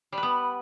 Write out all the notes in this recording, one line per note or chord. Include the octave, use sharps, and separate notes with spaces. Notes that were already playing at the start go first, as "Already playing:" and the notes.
G3
B4
B3